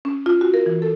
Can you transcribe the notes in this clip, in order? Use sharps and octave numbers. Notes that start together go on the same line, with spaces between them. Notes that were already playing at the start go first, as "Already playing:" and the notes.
C#4
F4
F#4
A#4
E3
A4